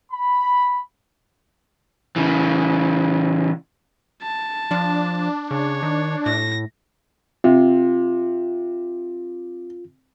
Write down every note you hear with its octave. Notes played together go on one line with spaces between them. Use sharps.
B5
C#3 E3
A5
F3 D4
C#3 C#5
D#3
A2 A#6
C3 F4